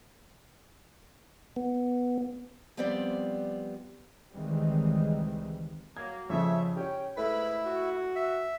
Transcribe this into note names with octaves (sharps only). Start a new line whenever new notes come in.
B3
F3 G3 B3 C4 G4 D5
C#2 D#3 E3 G3 G#3 C4
F#3 A#3 G#6
F2 C#3 F3 C#5 E5
C#4 G4 C#5 G5
G#2 A3 E4 B4 B5
F#4
E5